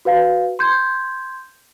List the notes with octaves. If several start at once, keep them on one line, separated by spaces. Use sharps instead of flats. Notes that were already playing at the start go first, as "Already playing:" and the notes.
F#4 B4 F5
C6 G6 G#6